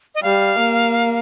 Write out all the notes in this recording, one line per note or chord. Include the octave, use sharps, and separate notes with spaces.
D#5
G3 F5
A#3